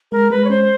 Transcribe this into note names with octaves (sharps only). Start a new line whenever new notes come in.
G#3 A#4
G#3 B4
C#5
C#4 C5